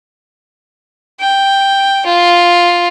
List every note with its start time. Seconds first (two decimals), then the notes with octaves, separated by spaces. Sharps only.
1.20 G5
2.06 F4